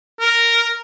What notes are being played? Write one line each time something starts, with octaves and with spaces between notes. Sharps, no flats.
A#4